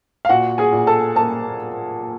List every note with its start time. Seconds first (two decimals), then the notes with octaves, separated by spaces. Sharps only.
0.25 F5
0.29 A#2 F#4 F#5
0.58 G#4 G#5
0.73 A#2
0.87 A4 A5
1.16 A#3 A4 A5